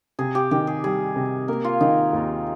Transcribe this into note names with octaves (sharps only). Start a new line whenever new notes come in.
C3 G#4
G4
D#3 G4
G#4
G3 G#4
C3
A#3 A#4
F4
D#3 D#4
D#2